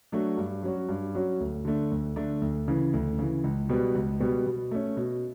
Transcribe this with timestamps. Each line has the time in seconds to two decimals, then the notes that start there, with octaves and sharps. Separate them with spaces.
0.12 F#3 A3 D4 F#4
0.37 G2
0.63 F#3 C#4 F#4
0.89 G2
1.15 F#3 C#4 F#4
1.40 D2
1.65 D3 A3 D4
1.91 D2
2.16 D3 A3 D4
2.42 D2
2.68 C#3 E3
2.93 D2
3.19 C#3 E3
3.44 C#2
3.69 B2 G3 B3
3.94 C#2
4.20 B2 G3 B3
4.47 B2
4.71 A3 C#4
4.97 B2